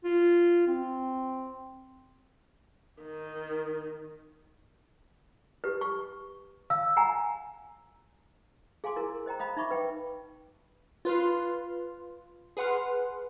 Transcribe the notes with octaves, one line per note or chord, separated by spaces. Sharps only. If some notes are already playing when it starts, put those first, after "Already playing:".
F4
C4
D#3
G4 B4
C#6
F5 E6
F#5 G#5 A#5
G#4 F5 G#5 C6 D6
E4 A#4
C5 D#5 G5 A#5
D#5 F5 B5 D#6
D#4 E5 B5 C#6 D6
B4 G5
F4 B4 C6 F6
G#4 B4 F#5 C6 F6